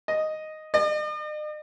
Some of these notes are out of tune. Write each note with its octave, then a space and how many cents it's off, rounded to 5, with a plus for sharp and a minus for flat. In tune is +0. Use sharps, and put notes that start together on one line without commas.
D#5 +0
D#5 -45